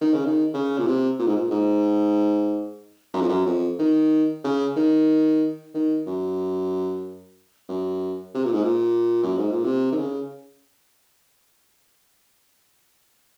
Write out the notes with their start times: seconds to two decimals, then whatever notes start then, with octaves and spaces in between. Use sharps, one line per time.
0.01 D#3
0.14 C#3
0.25 D#3
0.54 C#3
0.78 A#2
0.86 C3
1.19 A#2
1.27 G#2
1.36 A#2
1.51 G#2
3.14 F#2
3.21 F2
3.29 F#2
3.46 F2
3.79 D#3
4.44 C#3
4.76 D#3
5.74 D#3
6.06 F#2
7.69 F#2
8.34 C3
8.44 A#2
8.54 G#2
8.64 A#2
9.23 F#2
9.37 G#2
9.51 A#2
9.64 C3
9.92 D#3
9.97 C#3